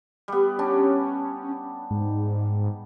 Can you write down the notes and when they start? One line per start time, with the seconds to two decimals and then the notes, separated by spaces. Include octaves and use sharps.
0.28 G3 B3
0.59 C#4 D4 G4
1.91 G#2